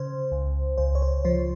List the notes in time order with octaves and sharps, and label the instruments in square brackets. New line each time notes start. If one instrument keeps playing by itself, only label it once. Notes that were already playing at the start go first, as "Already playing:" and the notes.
Already playing: [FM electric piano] C#3 C5
C#2
C#2 C5
C#5
C5
F3 C5